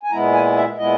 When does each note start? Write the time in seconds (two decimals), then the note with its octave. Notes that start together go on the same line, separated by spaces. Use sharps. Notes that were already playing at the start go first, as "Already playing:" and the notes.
0.03 G#5
0.11 A#2 G#3 B3 E4 A#5
0.33 G#5
0.56 E5
0.78 A#2 G#3 B3 E4 D#5